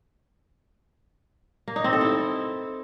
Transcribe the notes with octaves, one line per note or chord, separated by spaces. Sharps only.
A#3
D#4
C4
A4
E4